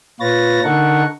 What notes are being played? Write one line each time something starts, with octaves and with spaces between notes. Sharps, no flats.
A#2 F4 B4 C#5 A6 A#6
D3 D#4 A4 A#4 F#5 C#6